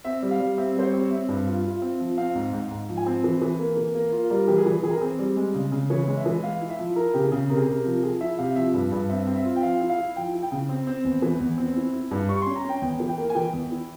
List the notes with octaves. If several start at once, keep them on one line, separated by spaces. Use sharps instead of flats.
C4 E5
G3
F5
G3
C4 E5
G3 C5
C#5
C4
C#5
C4 E5
G2
F4
F4
C4
F3
C4 F5
G#2
G#2
G#2
F3
G#5
C4
E3
E3
A#3
E3
A#3
F4
G3 A#4
E3 G4
G#4
E3
E3 G#4
A#4
C4 G#4
G3
G#3
C#3
C#3
E3 C#5
G#3
E5
E3
G#3 F5
E4
E5
F3
E4 A#4
C#3 G4
G#4
C#3
C3 A#4
G#4
C3 A#4
F3
F3 G#4
E4 E5
C3 F5
F3 E5
G2
G2
C4 E5
C4
E5
F4
G5
F3 F5
E4
F5
E4
F3 G5
E4
G5
C#3
C4
C4
E2
E3
E2
C4
E4
E4
G2
G3 C#6
C#4 C6
A#5
C#4 G5
E2 G5
E3
G5
A#3
G#5
E3 G5
E2
E4